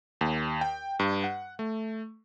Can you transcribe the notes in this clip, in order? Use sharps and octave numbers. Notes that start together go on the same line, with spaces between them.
D#2
G5
G2
F#5
A3